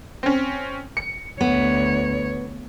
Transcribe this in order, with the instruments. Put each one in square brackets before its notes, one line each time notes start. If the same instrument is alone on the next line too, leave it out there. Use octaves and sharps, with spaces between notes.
[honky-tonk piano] C4 C#4
C#7
[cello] D2 C#5 [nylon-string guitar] B3